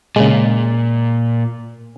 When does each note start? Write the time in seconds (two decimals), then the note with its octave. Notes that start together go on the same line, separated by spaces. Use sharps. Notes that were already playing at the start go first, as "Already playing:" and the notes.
0.16 A#2 C#3 G#3